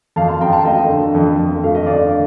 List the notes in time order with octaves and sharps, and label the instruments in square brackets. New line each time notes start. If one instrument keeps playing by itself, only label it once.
[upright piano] F2 F5 A5
A5 C6
F2 G5 A#5
F5 A5
A3 D#5 G5
D3
F2
F2
A3 F5
D#5
D3 D5 F5